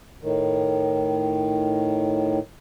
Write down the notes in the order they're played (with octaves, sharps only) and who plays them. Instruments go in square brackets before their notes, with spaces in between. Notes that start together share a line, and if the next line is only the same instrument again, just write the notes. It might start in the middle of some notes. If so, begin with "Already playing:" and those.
[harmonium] A2 D#3